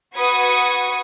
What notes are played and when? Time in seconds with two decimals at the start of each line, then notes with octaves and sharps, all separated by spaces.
0.17 F#4 B4 D#6 G#6 C#7